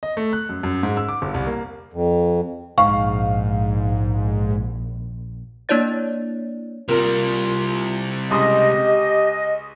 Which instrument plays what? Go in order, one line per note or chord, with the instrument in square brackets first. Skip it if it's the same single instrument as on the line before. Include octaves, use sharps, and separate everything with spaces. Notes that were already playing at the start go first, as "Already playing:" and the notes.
[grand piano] D#5
A3
F#6
F#2
F#2
G#2
E6
D6
G1
C2
A#3
[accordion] F2
[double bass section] A#1 [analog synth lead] G#2 [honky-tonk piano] F5 [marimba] C#6
[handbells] A#3 D4 E4 C#5 D5 A6
[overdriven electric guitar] C3 G3 [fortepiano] A#3 A#4 [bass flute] F4
[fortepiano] C#2 C6 D#6 [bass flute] G4 [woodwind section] D#5